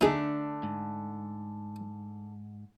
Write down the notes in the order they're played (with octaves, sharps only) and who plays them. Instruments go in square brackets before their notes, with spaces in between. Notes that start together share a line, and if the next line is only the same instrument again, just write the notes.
[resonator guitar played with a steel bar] D3 A3 D4 [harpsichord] D#4 G#4
[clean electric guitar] G#2